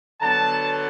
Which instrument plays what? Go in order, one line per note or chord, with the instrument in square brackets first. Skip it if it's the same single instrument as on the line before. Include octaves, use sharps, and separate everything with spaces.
[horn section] D3 F#3 B3 A5